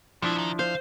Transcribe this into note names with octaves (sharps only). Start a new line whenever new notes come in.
B2 F3 D4 E4 E5
E2 D#3
C5 F5